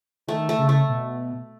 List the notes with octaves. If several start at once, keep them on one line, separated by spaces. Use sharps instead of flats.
D#3 A3
A3
C#3
A3
B2